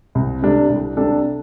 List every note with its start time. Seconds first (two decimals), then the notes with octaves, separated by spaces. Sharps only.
0.15 C2
0.42 C3 G3 D4 A4
0.69 C2
0.97 C3 G3 D4 A4